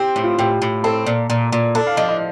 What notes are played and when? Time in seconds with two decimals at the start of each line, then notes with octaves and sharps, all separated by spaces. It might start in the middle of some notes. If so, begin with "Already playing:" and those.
Already playing: C4 G4
0.16 A2
0.23 F4
0.38 A2 G4
0.62 A2
0.84 C4 A4
1.06 A#2
1.30 A#2
1.52 A#2
1.75 D4 A4
1.87 F5
1.97 F3 D#5
2.08 D#5